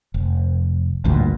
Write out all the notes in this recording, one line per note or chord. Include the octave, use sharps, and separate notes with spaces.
F1
A1 D2 G2 A#2